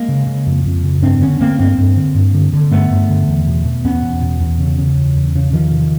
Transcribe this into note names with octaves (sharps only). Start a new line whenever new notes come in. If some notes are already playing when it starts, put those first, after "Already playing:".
Already playing: G#3 A#3
C#3
C#3
F2
F2
C#3
G2 C4 D4
D3 B3 C#4
D3 A#3 C4
G2 A#3 C4
G2
D3
G2
D3
D3
G2 A3 B3
G2
D3
E2
B2
B2
E2 B3 C#4
E2
B2
E2
C#3
C#3
E2
E2
C#3
E2 D#3 F3
C3